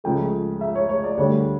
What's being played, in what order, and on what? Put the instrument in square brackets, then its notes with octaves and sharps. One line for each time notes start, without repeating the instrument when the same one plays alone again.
[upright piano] C#2 C#3 F3 A3 G5
E5
C#5
C#5
D5
D2 D3 G3 C#5